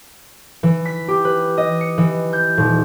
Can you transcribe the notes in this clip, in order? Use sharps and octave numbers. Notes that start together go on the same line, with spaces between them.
E3
B6
G4
B4
D#5
C#7
E3
G6
D#1